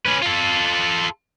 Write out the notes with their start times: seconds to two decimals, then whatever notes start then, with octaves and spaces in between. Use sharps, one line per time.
0.06 C#4 B4
0.22 F4 A4